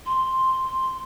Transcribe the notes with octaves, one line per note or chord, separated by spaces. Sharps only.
C6